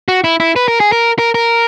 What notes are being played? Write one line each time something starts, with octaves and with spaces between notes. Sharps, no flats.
F#4
E4
E4
B4
A#4
G#4
A#4
A#4
A#4